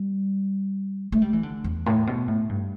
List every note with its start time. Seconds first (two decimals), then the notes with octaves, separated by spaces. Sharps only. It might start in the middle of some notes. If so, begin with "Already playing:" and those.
Already playing: G3
1.12 A3
1.22 G3
1.33 E3
1.43 D3
1.64 E2
1.86 A2
2.07 B2
2.28 A2
2.49 G2